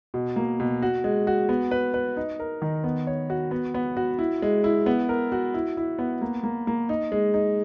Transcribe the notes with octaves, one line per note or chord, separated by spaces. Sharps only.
B2
A#3
B2
F#4
G#3
F#4
B3
B4
B4
D#4
A#4
D#3
B3
C#5
F#4
B3
B3
F#4
E4
G#3
E4
B3
A#4
F#4
E4
E4
B3
A#3
A#3
A#3
D#4
G#3
D#4